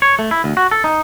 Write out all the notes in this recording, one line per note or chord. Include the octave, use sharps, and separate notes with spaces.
C#5
A3
E4
D2
F#4
A4
D#4